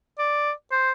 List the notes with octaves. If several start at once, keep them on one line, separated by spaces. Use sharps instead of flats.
D5
C5